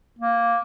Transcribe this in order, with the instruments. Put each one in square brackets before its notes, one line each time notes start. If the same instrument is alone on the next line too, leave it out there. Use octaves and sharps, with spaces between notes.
[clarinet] A#3